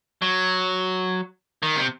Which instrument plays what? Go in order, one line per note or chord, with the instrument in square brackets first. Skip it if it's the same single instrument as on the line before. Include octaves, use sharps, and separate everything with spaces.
[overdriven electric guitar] F#3
D#3
C3